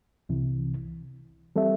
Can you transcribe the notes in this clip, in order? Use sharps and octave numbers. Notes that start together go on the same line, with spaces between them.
C2 C3 E3
E3 G3 C4 A4 E5